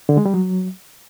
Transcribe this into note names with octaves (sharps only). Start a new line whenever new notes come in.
D3
G#3
G3
F#3